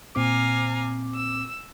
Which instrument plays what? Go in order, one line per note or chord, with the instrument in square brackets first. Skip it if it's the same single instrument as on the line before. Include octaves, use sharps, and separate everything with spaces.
[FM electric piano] A#2 C4 D6 [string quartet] F5 G#5 A#5
[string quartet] E6